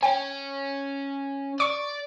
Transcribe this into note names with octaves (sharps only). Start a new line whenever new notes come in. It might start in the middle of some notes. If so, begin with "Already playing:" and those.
C#4 G5
D5 C#6